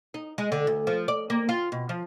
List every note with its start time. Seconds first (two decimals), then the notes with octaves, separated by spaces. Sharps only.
0.14 D#4
0.38 G#3
0.52 D3
0.67 D2
0.87 F3
1.08 D5
1.30 A#3
1.49 F4
1.72 B2
1.89 F3